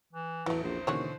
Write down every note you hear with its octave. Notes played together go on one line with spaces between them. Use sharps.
E3
A1 E2 E3 F#3 A3
A#1 C5
D#2 B2 D3 E3 C#4 F#4 C#5